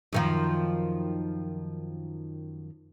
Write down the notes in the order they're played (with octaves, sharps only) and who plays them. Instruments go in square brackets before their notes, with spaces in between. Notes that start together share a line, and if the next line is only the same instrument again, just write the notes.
[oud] F#2 D#3 F3